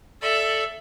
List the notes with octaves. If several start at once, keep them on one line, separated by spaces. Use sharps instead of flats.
A4 D5 E5